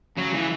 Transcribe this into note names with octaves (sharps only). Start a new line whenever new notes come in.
C#3 F#3
E3